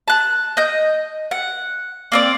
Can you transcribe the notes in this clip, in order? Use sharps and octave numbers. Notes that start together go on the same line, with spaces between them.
A5 F#6
D#5 G6
F#5
A#3 C4 D5